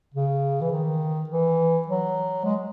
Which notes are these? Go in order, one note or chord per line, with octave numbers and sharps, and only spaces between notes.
C#3
E3
D#3
E3
F#3
G#3